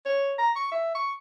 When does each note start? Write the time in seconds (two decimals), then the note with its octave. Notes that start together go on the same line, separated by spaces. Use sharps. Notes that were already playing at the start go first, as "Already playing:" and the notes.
0.05 C#5
0.38 A#5
0.56 C#6
0.72 E5
0.95 C#6